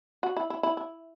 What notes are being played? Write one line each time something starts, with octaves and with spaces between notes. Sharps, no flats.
F#4
E4
E4
E4
E4